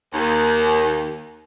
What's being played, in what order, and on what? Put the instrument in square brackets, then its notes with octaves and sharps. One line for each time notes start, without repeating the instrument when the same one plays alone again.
[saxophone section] D#2